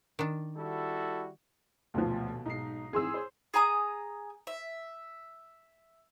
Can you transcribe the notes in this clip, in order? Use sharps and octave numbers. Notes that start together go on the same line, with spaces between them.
D#3 D4
G3 E4 F#4 A4
D#1 D2 B2 F3
B1 G#2 D#4 C7
G#2 E3 C4 G#4 C6 E6
C5
G#4 G#5 A#5 D#6
E5